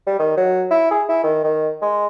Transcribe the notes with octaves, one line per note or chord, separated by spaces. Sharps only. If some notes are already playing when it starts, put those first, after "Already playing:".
G3
D#3
F#3
E4
G#4
E4
D#3
D#3
G#3